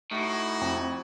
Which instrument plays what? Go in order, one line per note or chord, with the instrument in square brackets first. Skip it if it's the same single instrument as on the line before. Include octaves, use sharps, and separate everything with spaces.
[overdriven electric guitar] A2 [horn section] D#4 E4 F#4
[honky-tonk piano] F2